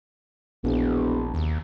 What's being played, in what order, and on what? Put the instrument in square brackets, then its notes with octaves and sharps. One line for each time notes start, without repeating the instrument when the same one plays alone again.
[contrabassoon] E1 [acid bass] A#1
[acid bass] D#2